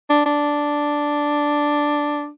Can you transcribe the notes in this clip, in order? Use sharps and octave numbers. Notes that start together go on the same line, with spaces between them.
D4
D4